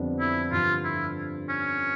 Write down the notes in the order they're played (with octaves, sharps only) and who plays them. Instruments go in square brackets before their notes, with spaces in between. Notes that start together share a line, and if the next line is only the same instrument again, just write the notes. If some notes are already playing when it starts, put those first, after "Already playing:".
Already playing: [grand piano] F2 D3 G3 B3 D4
[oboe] E4
[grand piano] G2 D3 F3 [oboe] F4
[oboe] E4
C#4